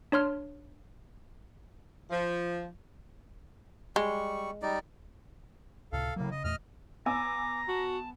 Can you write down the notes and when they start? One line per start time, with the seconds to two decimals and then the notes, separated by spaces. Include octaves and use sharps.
0.12 D4 C#5 C6 F6
2.10 F3
3.96 G3 G#3 C#6
4.62 G3 D#4 D5
5.93 C#2 A2 C3 A4 F5
6.16 A2 C#3 F#3 A#3
6.31 C#3 D#5
6.44 E2 A#2 A3 D#5 F6
7.06 B3 G#5 A#5 D6 E6
7.68 F#4 A5